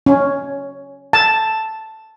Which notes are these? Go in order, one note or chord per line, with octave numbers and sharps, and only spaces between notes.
C#4
A5